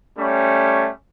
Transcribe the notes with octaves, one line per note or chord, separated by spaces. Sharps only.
G3 A3 C#4